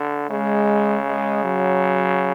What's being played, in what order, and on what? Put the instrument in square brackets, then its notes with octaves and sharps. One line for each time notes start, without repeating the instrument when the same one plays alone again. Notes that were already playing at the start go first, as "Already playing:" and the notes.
Already playing: [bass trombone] D3
[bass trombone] C#3 [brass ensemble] G#3
[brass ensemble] G#3
F#3